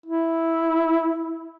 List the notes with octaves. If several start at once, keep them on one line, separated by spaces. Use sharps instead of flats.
E4